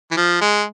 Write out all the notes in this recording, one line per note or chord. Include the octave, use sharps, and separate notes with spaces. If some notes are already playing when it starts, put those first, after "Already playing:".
E3
F3
G#3